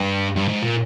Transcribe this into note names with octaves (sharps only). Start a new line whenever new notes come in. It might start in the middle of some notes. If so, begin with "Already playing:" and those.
Already playing: G2
G2
G#2
A#2